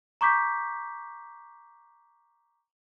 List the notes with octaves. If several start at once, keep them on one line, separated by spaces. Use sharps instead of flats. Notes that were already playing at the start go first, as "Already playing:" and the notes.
A#5 C#6 D6 G6 B6